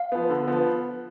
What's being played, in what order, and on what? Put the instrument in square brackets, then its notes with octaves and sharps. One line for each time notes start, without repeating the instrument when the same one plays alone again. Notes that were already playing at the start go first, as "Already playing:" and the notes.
Already playing: [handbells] F5
[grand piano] F3 B3
D3
F3 B3